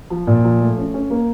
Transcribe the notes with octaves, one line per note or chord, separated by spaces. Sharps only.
F3
A#2
F3
A3
C#4
C#4
A#3